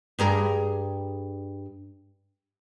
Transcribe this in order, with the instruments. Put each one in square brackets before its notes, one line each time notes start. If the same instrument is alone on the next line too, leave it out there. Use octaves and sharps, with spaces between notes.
[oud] G2 G#4 A#4